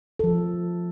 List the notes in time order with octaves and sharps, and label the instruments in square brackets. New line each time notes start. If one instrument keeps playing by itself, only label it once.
[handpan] F3 A4